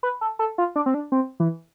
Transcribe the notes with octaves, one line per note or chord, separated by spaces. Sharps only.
B4
A4
A4
F4
D4
C4
D4
C4
E3